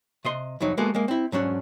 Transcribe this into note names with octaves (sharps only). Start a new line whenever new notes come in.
C3 D#5 C6
C2 F2 F#3 D#4
G#3 A#3 B3 F#4 G#4 A4
G#3 A#3
C4 E4
G#2 F#3 C#4 D4